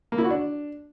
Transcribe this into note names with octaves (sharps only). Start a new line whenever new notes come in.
A#3
E4
F#4
D4